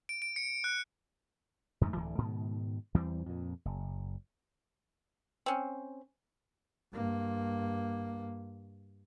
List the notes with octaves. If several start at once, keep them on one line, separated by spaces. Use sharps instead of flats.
D7
D7
C#7
F#6
F2 G#2 D3 A3
D1 D2 D3 E3
G#2 B2 D#3
E2 E3 G3 C4
F2 A#2
F#1
C4 C#4
G2 A#3